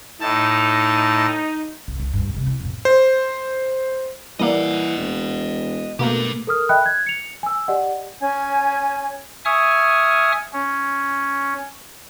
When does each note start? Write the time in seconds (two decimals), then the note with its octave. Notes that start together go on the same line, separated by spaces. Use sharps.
0.21 A2 D#4 A5
1.88 B1
1.99 C#2
2.13 D2 G2
2.34 C3 G#3
2.47 E4
2.60 F2 A#2
2.85 C5
4.39 E3 G3 A#3 D5 D#5 F#5
4.98 E1
5.99 B2 A3 A#3 G4 B4
6.47 A4 A#4 D#6 F6
6.69 D#5 E5 G5 B5 F#6
6.82 F#6 G#6
7.06 C#7 F7
7.43 G#5 E6
7.68 G4 D5 D#5 F#5
8.21 C#4 G#5 G#6
9.45 E5 G#5 C#6 D#6 F6
10.53 C#4